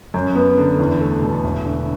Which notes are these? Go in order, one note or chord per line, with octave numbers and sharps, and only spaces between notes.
F#2
B3
D3
E2
A3
B2
E1
D3